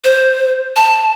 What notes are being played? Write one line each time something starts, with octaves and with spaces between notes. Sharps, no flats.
C5
A5